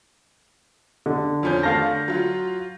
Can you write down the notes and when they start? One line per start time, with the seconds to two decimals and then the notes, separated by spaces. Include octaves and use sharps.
1.06 D3
1.43 F2 C#4 G6
1.63 D3 A3 F5 A5 A#6
2.08 F#3 F4